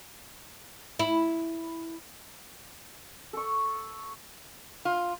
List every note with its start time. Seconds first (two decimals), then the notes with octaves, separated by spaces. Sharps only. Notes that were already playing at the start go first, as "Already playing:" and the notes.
0.99 E4
3.33 A4 C#6
4.85 F4